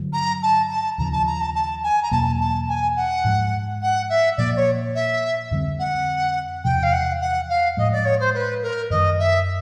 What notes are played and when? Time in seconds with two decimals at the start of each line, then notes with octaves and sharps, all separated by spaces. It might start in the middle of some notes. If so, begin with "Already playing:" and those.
Already playing: G2 D3 F#3
0.13 A#5
0.42 A5
0.70 A5
0.98 D#2 C#3 F3 A#5
1.12 A5
1.27 A#5
1.40 A5
1.55 A5
1.84 G#5
2.02 A#5
2.11 E2 B2 F#3 A#3 A5
2.40 A5
2.68 G#5
2.96 F#5
3.24 G#2 F3 G#3
3.82 F#5
4.10 E5
4.37 A#2 F3 A#3 D5
4.56 C#5
4.95 E5
5.51 F2 D3 G3 C4
5.79 F#5
6.64 E2 C3 F3 G5
6.83 F5
6.92 F#5
7.21 F#5
7.49 F5
7.77 A2 F3 G#3 D#5
7.92 D5
8.05 C#5
8.20 C5
8.34 B4
8.62 A#4
8.90 F#2 D#3 G3 D#5
9.19 E5